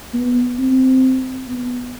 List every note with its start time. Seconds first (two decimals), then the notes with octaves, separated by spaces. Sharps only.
0.14 B3
0.58 C4
1.48 B3